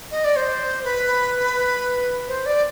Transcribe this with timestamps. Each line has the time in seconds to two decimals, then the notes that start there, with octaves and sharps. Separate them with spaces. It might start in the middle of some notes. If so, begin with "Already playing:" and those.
0.11 D#5
0.24 D5
0.36 C5
0.84 B4
2.27 C5
2.45 D5